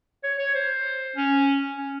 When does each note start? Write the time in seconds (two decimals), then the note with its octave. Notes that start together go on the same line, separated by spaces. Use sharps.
0.24 C#5
0.39 C#5
0.54 C5
1.16 C#4
1.77 C#4